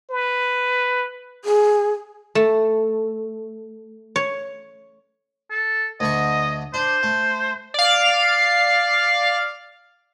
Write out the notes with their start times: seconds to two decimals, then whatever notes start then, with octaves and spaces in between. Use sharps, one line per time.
0.10 B4
1.45 G#4
2.35 A3
4.16 C#5
5.50 A4
6.00 D2 D3 D#5 C#6
6.74 D4 C5
7.03 A3
7.74 D5 F5